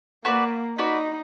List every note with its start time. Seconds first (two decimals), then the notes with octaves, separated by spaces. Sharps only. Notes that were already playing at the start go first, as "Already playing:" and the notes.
0.25 A#3 F#4 B4 D5
0.78 D#4 F#4 B4 D5